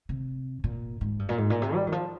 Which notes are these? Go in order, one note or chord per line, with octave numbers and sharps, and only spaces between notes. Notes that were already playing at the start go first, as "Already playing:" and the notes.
C3
A#2
G#2
G2
A#2
G#2
A#2
C3
G3
D#3
F3